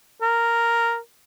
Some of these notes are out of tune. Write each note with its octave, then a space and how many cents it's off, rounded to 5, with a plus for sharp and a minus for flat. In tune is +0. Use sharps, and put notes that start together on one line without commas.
A#4 -5